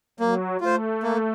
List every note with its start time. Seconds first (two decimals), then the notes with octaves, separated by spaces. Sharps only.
0.20 F#3 A#3
0.61 A3 F4 C5
1.03 A#3